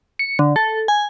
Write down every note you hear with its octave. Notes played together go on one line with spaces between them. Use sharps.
C#7
D3
A4
G#5